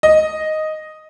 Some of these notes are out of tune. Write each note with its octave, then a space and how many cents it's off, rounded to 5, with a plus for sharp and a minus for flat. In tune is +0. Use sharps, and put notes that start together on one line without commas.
D#5 +5